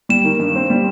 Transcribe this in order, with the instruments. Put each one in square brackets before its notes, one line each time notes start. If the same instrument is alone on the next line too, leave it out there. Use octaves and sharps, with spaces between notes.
[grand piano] G3 [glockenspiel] E7
[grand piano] D#3
G2
C4
G3